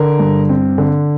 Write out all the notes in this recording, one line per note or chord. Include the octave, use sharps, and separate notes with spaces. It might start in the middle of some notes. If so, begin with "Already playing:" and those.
Already playing: D3 A#4
G2
C4
D3